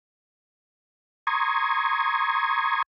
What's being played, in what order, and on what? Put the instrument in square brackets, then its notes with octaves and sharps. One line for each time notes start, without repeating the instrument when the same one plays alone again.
[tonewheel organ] A#5 C6 C#6 D#6 G#6